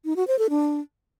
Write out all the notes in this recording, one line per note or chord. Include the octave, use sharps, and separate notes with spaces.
D#4
F#4
C5
A4
D4